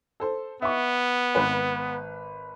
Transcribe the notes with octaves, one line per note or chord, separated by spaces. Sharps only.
A4 C5
B3 E5 C#6
G#1 B4